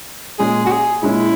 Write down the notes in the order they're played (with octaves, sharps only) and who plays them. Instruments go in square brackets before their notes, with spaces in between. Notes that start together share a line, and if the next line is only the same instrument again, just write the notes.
[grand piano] A#2 G#3 C#4 [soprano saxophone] G#4
[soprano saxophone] F#4
G#4
[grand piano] A#2 G#3 C#4 [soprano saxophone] E4